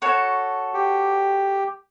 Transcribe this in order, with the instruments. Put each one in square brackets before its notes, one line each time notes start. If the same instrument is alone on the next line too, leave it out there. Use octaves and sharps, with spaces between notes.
[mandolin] F#4 A4 C#5
[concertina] G4